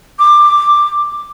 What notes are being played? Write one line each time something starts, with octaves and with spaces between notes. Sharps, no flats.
D6